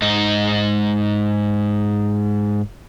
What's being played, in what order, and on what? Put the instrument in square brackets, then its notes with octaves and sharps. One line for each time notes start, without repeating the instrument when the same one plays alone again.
[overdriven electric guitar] G#2 D#4